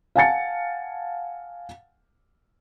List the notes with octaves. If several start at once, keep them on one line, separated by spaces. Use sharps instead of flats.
F5 F#5 G#5 A5 A6 C#7